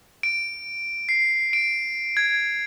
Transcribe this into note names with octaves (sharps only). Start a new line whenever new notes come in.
D7
C7
D7
G#6